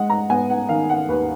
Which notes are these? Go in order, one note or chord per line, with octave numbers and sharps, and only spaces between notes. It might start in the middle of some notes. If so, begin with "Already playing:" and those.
Already playing: G#3 F#5
A#5
B3 G#5
F#5
D#3 F5
F#5
D#2 B4